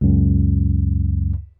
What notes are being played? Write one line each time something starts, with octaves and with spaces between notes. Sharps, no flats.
C#2 F#2